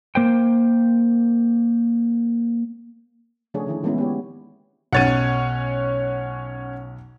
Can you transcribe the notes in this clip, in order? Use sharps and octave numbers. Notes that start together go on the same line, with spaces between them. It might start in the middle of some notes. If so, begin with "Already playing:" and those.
A#3 C5 G5
C#3 F3 A3 D4 G#4 C#5
D3 D#3 E4
E3 G#3 A#3 B3 C#4 E4
B3 G4 C#5
B1 C#4 C#5 F#5 A6 D#7